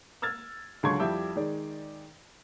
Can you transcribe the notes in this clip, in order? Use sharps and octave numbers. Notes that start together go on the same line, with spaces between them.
E6 F6 G#6 A6
C#2 D3 F#3 C6 C#6 G#6
F2 G3 E4 E5 D6 G6
D#3 G#3 D5